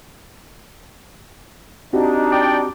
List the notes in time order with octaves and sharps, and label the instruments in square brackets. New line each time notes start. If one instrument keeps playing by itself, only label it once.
[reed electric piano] C4 F#4 G4 [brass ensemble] D4 D#4
[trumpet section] D5 G5